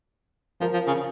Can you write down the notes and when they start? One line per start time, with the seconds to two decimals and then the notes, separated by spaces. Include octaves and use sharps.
0.61 F3 A#4
0.74 F3
0.87 C#3